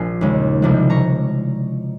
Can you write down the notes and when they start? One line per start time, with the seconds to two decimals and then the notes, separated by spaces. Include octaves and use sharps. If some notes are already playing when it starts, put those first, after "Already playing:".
Already playing: A#1 A#2 F3 G#5 C6
0.21 D#2 C#3 G#3
0.62 C2 C3 F3 G#3
0.90 A#5 C#6